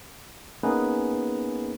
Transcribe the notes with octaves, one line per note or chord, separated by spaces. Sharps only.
A#3 B3 C#4 D#4 G#4 B4